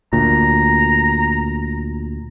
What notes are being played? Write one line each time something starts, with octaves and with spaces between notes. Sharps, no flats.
D2 A#2 A#5